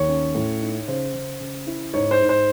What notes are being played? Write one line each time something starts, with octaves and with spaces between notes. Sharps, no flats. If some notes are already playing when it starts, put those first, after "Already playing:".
Already playing: D#2 C#5
C#4
A2
D#4
C#3 C5
C#3
C#3
E4
G#2 C#5
C5
G#2
C5